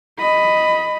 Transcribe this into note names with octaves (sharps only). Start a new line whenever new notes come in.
D#5 B5